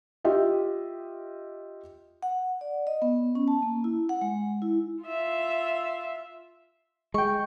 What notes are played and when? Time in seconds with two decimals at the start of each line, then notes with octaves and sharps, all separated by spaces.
0.24 F4 G4 D#5 E5
2.22 F#5
2.61 D5
2.87 D#5
3.02 B3
3.35 C#4
3.48 A5
3.62 A#3
3.84 E4
4.09 F#5
4.21 G#3
4.62 E4
5.03 F4 E5
7.14 G#3 G5 C#6